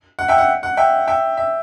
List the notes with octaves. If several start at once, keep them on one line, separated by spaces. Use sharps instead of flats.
F#5
E5 G5
F#5
F#5
E5 G5
E5 G5
E5